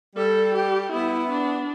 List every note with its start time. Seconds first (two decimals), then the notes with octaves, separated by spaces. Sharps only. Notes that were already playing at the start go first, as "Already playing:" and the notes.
0.16 G3 A4
0.54 G4
0.92 B3 E4
1.30 D4